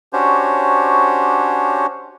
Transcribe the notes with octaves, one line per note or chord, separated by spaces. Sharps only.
C#4 D4 F#4 G4 C5 C#5